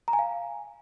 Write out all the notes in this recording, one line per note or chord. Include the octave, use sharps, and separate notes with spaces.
A#5
G#5
F5